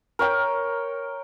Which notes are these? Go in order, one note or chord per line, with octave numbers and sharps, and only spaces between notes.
A#4 C#5 G5